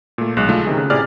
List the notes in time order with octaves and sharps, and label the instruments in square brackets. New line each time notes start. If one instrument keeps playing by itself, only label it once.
[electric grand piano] A#2 A3
B1 G#3 F#6
D3 G#3 A3 F4
C3 D#3 G#4
C#3
A2 C3 G#4 D5 F6